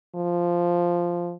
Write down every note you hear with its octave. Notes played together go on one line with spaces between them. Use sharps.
F3